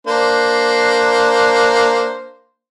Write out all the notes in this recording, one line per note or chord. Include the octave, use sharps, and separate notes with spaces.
A#3 D4 C5